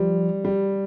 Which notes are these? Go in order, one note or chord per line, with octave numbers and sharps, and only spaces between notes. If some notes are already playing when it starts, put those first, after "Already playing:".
Already playing: F3 G3
G3